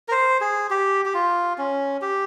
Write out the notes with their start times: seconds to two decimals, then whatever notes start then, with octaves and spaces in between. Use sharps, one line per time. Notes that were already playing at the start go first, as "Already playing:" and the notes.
0.08 A#4
0.11 C5
0.41 G#4
0.70 G4
1.05 G4
1.14 F4
1.58 C#4
2.02 G4